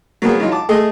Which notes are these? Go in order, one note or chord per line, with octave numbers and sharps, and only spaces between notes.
F#3 A#3 B3 G#4
E3 F#3 D#4 F4
A5 D6
A3 G#4 A4 D#5